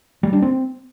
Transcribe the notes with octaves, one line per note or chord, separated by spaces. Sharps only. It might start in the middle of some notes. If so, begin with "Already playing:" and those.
G3
D4
C4